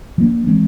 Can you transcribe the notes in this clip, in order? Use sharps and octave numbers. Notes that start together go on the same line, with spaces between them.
F3 A#3 D4
E3 G#3 C4